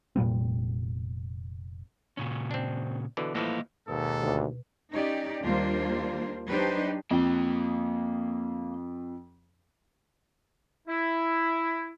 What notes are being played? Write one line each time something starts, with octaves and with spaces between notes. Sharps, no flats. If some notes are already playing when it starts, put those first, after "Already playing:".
F1 A#2 G3 C4
A#2 C#3 C#4
C4 D4
B2 D3 E3
A2 E3 F3 A#3 D#5 E5
D#2 G#2 B2 A4
D2
C#4 D#4 G4 D5
D#2 G3 A#3 D4 F4 C5
F#3 D4 D#4 G4 B4 C5
F2 A#3 G5
E4